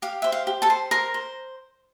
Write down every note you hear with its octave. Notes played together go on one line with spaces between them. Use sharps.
G4 F5
C5 E5
F5
G4
A4 A5
C5
A#4 C5 A#5
C5